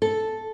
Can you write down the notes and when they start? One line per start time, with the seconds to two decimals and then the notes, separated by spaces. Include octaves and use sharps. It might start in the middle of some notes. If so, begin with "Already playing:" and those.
0.02 A4